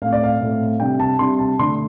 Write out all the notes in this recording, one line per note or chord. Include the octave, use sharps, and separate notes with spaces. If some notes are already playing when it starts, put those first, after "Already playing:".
A2 A3 C4 F5
D5
F5
A2 A3 C4
C3 G3 D4 G5
A5
C3 G3 D4 C6
A5
D3 A3 D4 C6